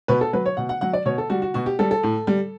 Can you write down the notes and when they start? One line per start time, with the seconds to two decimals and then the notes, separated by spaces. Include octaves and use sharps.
0.08 B2 B4
0.21 A4
0.33 F#3 B4
0.46 C#5
0.57 B2 F#5
0.69 F#5
0.81 F#3 F#5
0.93 D5
1.05 B2 C#5
1.18 A4
1.30 G3 F#4
1.42 F#4
1.54 B2 F#4
1.66 G4
1.79 G3 A4
1.91 A4
2.03 A2
2.27 G3